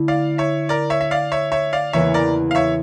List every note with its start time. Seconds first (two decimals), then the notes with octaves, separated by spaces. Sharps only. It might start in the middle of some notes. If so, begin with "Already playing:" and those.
Already playing: D3 A3 E4
0.08 D5 F5
0.38 C#5 E5
0.69 A#4 D5
0.90 C#5 E5
1.01 E5
1.11 D5 F5
1.32 C#5 E5
1.52 C#5 E5
1.73 D5 F5
1.93 E2 C#3 E3 A#3 E4 C#5 E5
2.14 A#4 D5
2.51 F5
2.55 C#5 E5